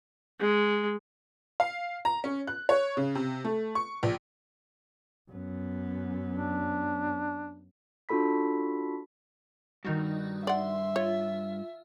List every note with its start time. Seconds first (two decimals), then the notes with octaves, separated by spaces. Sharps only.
0.40 G#3
1.60 F5
2.05 A#5
2.24 C#4
2.47 F#6
2.69 C#5
2.97 C#3
3.15 C3
3.44 A3
3.75 C#6
4.03 A#1
5.31 F#2 B3
6.32 D4
8.09 D4 F4 F#4 A4 B5 B6
9.85 G2 D#3 D#4 F#4
10.47 D5 E5 F#5 C6
10.96 F4 C#5